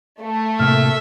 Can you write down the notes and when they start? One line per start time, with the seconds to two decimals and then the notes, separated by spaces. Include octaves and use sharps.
0.22 A3
0.59 A2 C3 A#3 E5 F6